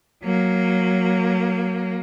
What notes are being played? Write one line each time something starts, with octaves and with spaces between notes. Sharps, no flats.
F#3 A#3